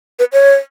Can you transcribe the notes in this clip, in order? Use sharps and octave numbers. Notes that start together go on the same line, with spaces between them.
B4
C#5